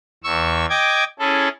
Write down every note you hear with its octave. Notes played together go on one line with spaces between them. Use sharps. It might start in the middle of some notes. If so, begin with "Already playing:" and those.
E2 C#6 E6
D#5 G5 D6 G#6
C#4 E4 G#4 A4